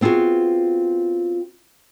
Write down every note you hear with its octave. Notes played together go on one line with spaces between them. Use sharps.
B3 C4 F4 F#4 G#4